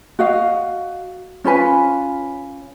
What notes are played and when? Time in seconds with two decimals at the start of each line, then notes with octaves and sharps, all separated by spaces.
0.19 F#4 D#5 F5
1.44 C#4 F4 B4 G#5